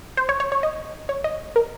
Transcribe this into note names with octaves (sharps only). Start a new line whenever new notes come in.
C5
C#5
C#5
C#5
D#5
C#5
D#5
A#4